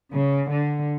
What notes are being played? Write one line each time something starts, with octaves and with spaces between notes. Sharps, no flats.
C#3
D3